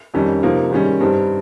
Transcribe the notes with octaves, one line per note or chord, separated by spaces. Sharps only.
F2 D#3 G3 C#4
C3 F3 A#3 D#4
G#2 D#3 G3 C#4
G2 G3 C4 D#4